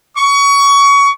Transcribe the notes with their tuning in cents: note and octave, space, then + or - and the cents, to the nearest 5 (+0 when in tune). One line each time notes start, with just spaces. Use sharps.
C#6 +25